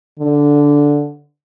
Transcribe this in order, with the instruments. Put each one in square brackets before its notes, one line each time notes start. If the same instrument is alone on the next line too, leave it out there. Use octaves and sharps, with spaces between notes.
[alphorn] D3